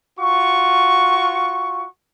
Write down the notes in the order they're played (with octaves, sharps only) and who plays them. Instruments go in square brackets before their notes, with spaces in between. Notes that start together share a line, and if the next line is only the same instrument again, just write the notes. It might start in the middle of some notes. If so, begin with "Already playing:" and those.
[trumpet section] F4 F#4 C#6